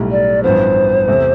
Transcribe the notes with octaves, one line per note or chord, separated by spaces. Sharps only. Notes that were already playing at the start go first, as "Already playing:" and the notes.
Already playing: B1 A2 G3
D5
A1 G2 F3 B3 C5
E2 C3 E3 A3